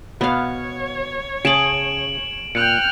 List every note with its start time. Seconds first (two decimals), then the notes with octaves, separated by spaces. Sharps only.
0.21 B2 B3 C#5 F5
1.45 C#3 G#4 A5 D7 E7 F#7
2.55 A#2 G5 F6 F#6 C#7